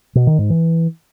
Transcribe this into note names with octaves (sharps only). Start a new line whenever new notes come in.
B2
D#3
G#2
E3